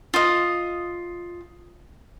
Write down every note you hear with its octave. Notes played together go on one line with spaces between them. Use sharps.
F4 D#5